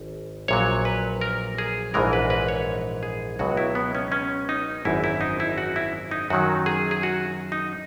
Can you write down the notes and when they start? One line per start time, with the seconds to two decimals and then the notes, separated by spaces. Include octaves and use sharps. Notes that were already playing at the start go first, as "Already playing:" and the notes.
Already playing: G#1
0.48 A#1 A#2 F#3 C#5
0.85 B4
1.21 A#4
1.58 G#4
1.94 A#1 G#2 E3 G#3 A#4
2.13 B4
2.30 B4
2.48 C#5
3.03 G#4
3.39 C#2 B2 F#3 F#4
3.57 E4
3.75 B3
3.95 C#4
4.12 C#4
4.49 D#4
4.85 G#1 F#2 E3 E4
5.04 E4
5.21 D#4
5.40 E4
5.58 F#4
5.76 E4
6.11 D#4
6.30 F#2 D#3 F#3 F#4
6.66 G#4
6.91 G#4
7.03 F#4
7.52 D#4